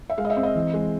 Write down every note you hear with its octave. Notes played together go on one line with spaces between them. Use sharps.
E5
G#3 F5
D#5
E5
C4
D#5
E3
G#3